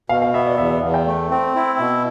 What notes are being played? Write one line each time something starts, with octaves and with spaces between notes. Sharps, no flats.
B2 F5
F5
B3 E5
D5
E2 E5
E5
E2 F5
G5
A3
C4
E4
B2